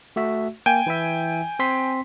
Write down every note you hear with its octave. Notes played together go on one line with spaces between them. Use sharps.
A3 F#4 E5
A#3 G5 G#5
E3 E4 E5
C4 C6 B6